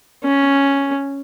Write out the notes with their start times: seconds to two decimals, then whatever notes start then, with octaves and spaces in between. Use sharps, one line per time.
0.24 C#4